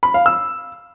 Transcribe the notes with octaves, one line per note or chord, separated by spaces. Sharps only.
B5
F5
E6